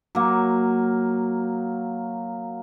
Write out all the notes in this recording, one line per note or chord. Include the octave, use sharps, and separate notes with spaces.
F#3 A#3